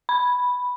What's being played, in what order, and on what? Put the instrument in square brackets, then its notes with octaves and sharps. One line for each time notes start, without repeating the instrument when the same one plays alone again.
[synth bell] B5